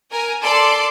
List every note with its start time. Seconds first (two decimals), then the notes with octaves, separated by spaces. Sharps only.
0.11 A#4 G#5
0.43 A4 D5 C6 D6